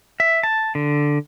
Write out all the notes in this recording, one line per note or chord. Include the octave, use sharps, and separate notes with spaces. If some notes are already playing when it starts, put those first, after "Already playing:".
E5
A5
D3